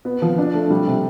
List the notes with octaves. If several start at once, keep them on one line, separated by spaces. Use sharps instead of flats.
B3
F3
D4
A3
G3
C3